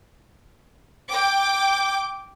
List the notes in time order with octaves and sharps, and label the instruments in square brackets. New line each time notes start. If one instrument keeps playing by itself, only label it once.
[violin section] G5 D6